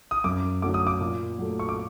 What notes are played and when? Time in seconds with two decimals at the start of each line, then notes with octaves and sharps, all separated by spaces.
0.11 D#6
0.24 F#2 D6
0.62 D3 F#3 A3 D6
0.74 D#6
0.87 D6
1.01 A#2
1.39 F#3 A3
1.59 C#6
1.69 D6